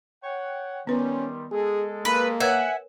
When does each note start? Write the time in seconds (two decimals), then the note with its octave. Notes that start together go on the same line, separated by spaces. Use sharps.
0.24 C#5 F#5 G5
0.87 D#3 G3 B3 C#4 B4 C6
1.51 G#3 G#4 A4
2.05 A#3 B4
2.40 A#4 B4 C#5 E5 F#5 G#5